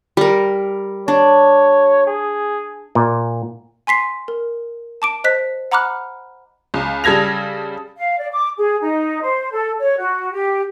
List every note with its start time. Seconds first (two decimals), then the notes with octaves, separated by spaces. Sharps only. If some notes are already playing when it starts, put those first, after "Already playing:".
0.17 G3 A#4
1.08 D4 C#5
2.07 G#4
2.95 A#2
3.87 G#5 C6 B6 C7
4.28 A#4
5.02 A5 D6 D7
5.24 C5 D#5 F#6 B6
5.72 F#5 A#5 B5 D6 F6 F#6
6.74 C#2
7.04 C#3 G3 A4 G#6 A#6 F7
7.97 F5
8.18 D5
8.32 D6
8.57 G#4
8.81 D#4
9.22 C5
9.52 A4
9.79 C#5
9.98 F#4
10.32 G4